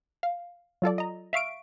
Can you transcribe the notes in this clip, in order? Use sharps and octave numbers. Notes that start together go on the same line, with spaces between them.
F5
F#3 F4 A4 D5
D#5 A#5
E5 F5 C#6 D7